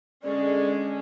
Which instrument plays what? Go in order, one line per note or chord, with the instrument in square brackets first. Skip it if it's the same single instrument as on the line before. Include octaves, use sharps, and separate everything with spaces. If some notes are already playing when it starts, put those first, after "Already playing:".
[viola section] D3 G#3 C#4 [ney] D5